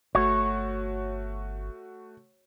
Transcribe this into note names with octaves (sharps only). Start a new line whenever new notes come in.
G1 A3 F#4 C#5